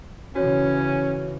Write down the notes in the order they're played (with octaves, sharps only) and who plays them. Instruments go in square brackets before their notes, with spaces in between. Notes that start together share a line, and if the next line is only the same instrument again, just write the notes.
[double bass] C#3 E3 [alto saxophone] C#4 [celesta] F#4 C#5